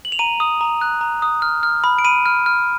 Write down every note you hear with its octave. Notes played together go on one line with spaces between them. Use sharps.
F#7
F7
A#5 D#7
D#6
A#5
F#6
A#5
D#6
F6
F6
B5
D7
B5 D#7
F6
F6